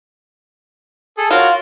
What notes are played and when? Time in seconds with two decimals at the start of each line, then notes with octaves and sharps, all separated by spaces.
1.18 G#4 A4
1.31 F4 F#4 A#4 C#5